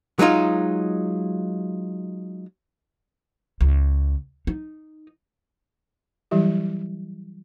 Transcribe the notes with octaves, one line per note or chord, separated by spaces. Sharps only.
F#3 G#3 D#4 F4
C#2
D#4
E3 F#3 G3 E4 G4